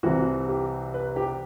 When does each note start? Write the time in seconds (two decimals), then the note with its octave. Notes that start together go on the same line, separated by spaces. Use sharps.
0.03 C2 C3 E3 F#4
0.48 G4
0.94 B4
1.16 G4